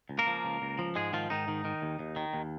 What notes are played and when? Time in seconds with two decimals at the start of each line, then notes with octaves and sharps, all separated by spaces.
0.09 C#2
0.19 A#3 A#4
0.27 F3
0.44 C#2
0.62 C#2
0.79 F3
0.95 G#2 G#3 G#4
1.13 D#3 F3 F4
1.30 G#2 D#3 D#4
1.48 D#3
1.65 D#3
1.82 D#2
1.99 D#2
2.16 D#3
2.34 D#2